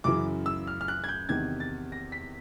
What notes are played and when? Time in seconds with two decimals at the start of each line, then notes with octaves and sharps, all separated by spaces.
0.04 F#2 C#3 E3 D6
0.46 E6
0.67 F6
0.81 F6
0.88 F#6
1.04 G#6
1.09 G6
1.29 E2 C3 D#3 G#6
1.60 A6
1.92 A#6
2.12 B6